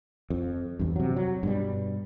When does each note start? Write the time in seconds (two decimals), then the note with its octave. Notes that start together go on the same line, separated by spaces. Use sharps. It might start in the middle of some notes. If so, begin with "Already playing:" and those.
0.30 F2
0.79 E2 G2
0.96 C3 F#3
1.16 F#3
1.43 G2 B2 G3